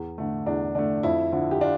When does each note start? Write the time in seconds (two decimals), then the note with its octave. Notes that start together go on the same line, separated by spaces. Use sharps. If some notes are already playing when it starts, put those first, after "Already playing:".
Already playing: E2
0.18 D3 A3
0.46 E2 D4
0.75 D3 A3 D4
1.03 F2 E4
1.32 D3 F3 E4
1.51 G4
1.61 D4 F4